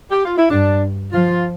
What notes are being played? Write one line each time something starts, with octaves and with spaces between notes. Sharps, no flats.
G4
F4
E4
G2 D4
F3 F4